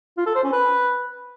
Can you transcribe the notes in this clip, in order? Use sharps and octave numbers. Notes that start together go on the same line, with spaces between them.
F4
A4
C5
C#4
B4